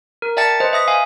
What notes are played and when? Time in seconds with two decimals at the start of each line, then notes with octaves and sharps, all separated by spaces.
0.22 A#4
0.37 D5 E5 G5 A5 A6 C#7
0.60 B4 C5 D#5
0.73 E5 D#6 A#6
0.88 E5 F5 G#5